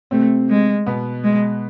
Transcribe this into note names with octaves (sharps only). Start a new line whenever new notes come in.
C3 A3 C4
G#3
B2 B3
G#3